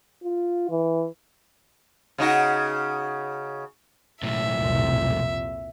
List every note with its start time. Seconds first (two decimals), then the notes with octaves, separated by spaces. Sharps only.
0.24 F4
0.70 E3
2.18 C#3 D#4 F#4
4.23 B1 A2 E5
4.54 C2 F2 A#2